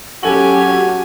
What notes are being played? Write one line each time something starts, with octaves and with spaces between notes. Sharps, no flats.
F#3 C#4 F#4 G4 A4 G#5 F#7